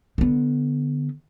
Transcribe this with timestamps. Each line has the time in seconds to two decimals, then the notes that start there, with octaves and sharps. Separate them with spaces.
0.18 D3 B3